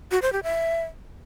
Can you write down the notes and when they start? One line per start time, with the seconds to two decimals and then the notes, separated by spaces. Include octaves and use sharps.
0.11 F#4
0.22 C5
0.33 G4
0.43 E5